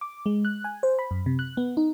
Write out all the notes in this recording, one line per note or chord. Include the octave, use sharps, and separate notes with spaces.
D6
G#3
F#6
G#5
C5
B5
F#2
C3
F#6
B3
D#4